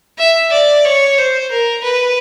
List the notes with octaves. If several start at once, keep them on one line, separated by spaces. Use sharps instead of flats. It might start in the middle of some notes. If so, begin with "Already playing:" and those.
E5
D5
C#5
C5
A#4
B4